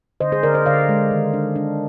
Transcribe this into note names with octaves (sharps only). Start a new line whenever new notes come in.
D3 C5 D#5
G#4 C5
D3 A#4 D5
C5 D#5
D3 D5 F5
G#3
D#3
D4
D4